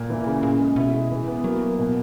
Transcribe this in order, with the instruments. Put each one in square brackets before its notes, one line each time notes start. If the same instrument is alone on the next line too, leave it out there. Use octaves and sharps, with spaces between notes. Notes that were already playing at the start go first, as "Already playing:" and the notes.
Already playing: [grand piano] A#2
E3
C#3
[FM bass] A#2 [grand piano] C#3
[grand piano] G#3
[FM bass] B2 [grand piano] E4
[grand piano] G#3
E3
B3
[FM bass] F#3 [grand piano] A#3
[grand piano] A#3
B2